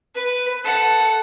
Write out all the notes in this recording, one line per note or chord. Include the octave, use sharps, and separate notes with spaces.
B4
A4 F#5